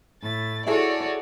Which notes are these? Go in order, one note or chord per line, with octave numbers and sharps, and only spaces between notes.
A2 A6
E4 F#4 G#4 A4 C#5 D5